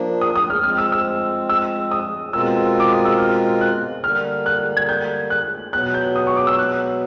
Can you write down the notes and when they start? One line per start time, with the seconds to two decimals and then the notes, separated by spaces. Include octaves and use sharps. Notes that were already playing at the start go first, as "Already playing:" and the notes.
Already playing: F3 A#3 D4
0.21 D#6
0.36 D#6
0.50 F6
0.64 F3 G#3 C4 F6
0.78 E6
0.92 E6
1.49 E6
1.91 D#6
2.33 B2 G#3 C4 F4 A#4 E6
2.80 D6
2.92 D#6
3.05 E6
3.19 F6
3.61 F#6
4.03 D3 G3 A#3 F6
4.46 F#6
4.77 G#6
4.89 G6
5.30 F#6
5.73 B2 F#3 B3 F#6
5.94 G6
6.16 D#6
6.27 C#6
6.36 D6
6.47 E6
6.59 F#6